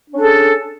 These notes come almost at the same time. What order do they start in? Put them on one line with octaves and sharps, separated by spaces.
D4 C#4 A4 G#4